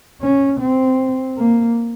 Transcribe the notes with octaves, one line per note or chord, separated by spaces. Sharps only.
C#4
C4
A#3